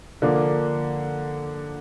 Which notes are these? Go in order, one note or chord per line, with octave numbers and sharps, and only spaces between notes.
D3 F3 A#3 D4